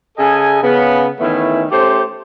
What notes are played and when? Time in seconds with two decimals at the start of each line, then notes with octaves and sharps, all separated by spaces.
0.18 C#3 G#4 A4 D#5 G#5
0.63 C#3 B3
1.21 D#3 E3 A3 B3 C#4 E4
1.72 A3 C#4 G4 C5